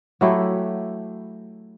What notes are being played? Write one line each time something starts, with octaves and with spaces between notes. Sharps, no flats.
F#3 A3 E4 G4